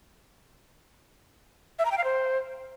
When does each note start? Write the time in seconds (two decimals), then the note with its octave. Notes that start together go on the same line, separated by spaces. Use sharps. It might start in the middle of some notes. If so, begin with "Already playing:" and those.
1.79 E5
1.85 A#5
1.91 G5
1.98 F5
2.04 C5